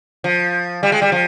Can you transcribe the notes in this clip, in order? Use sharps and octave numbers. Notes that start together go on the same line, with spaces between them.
F3
G3
G#3
G3
F3